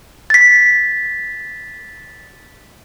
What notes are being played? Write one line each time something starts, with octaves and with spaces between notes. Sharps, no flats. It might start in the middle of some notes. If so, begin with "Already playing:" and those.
A6 B6